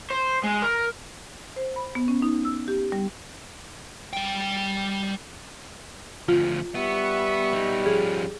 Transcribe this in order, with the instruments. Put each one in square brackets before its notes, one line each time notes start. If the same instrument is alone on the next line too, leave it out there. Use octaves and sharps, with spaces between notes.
[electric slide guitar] C5
G#3
A#4
[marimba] C5
B5
B3
C#4
D#4
E6
G4
G3
[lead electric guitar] G3 G5
[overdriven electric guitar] D2 F3 [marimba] F4
[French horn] G3 [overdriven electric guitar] B3 [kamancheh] E5 C#6
[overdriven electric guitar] B3 D#4
[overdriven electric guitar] F3 C#4 [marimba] G#4